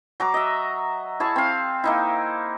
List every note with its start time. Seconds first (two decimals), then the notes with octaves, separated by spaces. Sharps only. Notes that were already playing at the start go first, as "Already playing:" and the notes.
0.20 F#3 A#5 D6
0.34 D#5 E5
1.20 E4 G#4 C#5 A5
1.36 C4 F5
1.84 A#3 D#4 E4